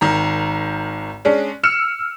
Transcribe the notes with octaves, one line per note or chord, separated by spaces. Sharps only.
G#1 D#3 A#5
G#3 C#4 D4
E6 F6 C#7 E7